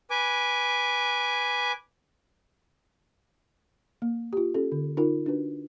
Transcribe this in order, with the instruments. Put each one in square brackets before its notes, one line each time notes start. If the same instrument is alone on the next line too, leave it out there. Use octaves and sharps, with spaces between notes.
[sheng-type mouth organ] B4 G#5 D6
[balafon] A#3
F4 G4
C#4 G4 A4
D3
D#4 F4 A#4
D4 F#4 B4